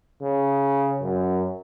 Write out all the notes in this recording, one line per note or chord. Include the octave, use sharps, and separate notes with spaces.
C#3
F#2